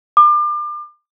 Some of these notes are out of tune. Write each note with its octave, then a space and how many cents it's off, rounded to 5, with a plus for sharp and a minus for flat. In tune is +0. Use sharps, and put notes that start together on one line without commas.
D6 +35